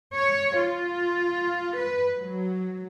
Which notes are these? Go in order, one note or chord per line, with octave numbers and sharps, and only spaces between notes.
C#5
F4
B4
F#3